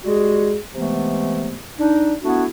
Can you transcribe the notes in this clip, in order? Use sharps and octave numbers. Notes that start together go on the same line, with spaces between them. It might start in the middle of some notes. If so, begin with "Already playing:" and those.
G3 G#3 F#4 G#4
C3 E3 G#3 A3 B3
D4 D#4
A3 B3 D4 E4 F#4